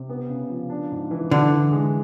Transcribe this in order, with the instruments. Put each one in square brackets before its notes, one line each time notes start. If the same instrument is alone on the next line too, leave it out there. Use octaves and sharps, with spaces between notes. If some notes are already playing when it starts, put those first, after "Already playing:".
Already playing: [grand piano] C3
B3
C#3
F3
D4
G#2
E3
[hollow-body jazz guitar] D3 [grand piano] D4
[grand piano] E3
G#3